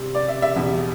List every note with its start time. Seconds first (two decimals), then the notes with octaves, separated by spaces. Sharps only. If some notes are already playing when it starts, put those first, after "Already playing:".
Already playing: C3 G3 C4
0.15 D5
0.28 E5
0.42 E5
0.56 E2 B2 G3